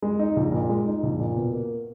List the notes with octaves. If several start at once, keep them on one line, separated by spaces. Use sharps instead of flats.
G#3
D#4
A#1
A#2
G#3
D#4
A#1
A#2
B2
A#3